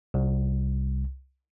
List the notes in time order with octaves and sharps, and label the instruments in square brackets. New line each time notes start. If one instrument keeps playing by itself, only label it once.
[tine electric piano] C2